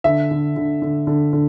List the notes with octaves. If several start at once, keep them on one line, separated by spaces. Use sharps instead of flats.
D3 E5
D3
D3
D3
D3
D3